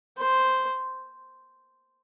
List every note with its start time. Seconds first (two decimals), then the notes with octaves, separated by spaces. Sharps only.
0.18 C5